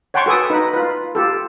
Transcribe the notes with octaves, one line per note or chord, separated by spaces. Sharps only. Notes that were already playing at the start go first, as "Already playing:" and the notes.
C#5 F#5 G5 A5 C6 C#6
F#4 A4 B4 G#5 D#6
D#4 B4
F4 B4
F4 G4 A4